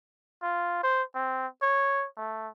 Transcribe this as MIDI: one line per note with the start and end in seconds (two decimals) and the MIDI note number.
0.42 0.83 65
0.83 1.03 72
1.14 1.47 60
1.62 2.06 73
2.17 2.48 57